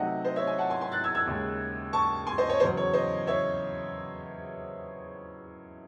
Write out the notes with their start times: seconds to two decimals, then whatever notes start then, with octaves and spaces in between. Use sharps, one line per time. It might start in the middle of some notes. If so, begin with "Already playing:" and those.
Already playing: C3 F#3 A3 D#4 D#5 F#5
0.25 C5 D#5
0.36 C#5 E5
0.47 E5 G#5
0.58 F#5 A5
0.70 G#5 C6
0.81 G#5 C6
0.92 F#6 A6
1.04 E6 G#6
1.15 E6 G#6
1.26 D#2 C#3 G#3
1.93 A5 C#6
2.27 G#5 C6
2.38 C5 D#5
2.50 C#5
2.60 E2 C5
2.63 C#3 F#3
2.77 C#5
2.93 C5 D#5
3.27 C#5 E5